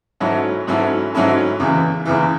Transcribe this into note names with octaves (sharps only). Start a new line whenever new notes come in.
G#2 F#3 C#4 E4 A4
G#2 F#3 C#4 E4 A4
G#2 F#3 C#4 E4 A4
E2 C#3 E3
E2 C#3 E3